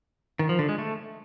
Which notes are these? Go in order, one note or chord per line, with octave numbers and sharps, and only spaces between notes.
D#3
F3
D3
G#3
A3